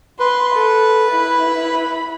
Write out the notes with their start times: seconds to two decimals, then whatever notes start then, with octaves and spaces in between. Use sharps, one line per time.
0.20 B4 C6
0.54 A4
1.10 E4 B5